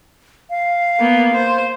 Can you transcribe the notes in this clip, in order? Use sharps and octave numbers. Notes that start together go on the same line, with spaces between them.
F5
A#3 B3
C5